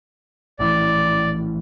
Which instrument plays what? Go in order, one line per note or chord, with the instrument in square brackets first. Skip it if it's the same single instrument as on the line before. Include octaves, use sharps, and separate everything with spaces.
[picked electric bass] A#1 A2 E3 [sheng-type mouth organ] D5